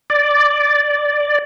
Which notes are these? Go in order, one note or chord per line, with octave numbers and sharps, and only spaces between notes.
D5